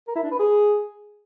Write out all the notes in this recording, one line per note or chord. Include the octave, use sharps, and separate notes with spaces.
A#4
E4
D4
B4
G#4